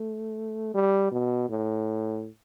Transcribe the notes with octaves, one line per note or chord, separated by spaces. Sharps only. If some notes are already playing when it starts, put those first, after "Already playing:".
Already playing: A3
G3
B2
A2